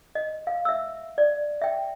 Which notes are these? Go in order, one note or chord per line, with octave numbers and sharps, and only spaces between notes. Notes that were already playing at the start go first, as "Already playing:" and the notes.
D#5
F5
E5 E6
D5
E5 G5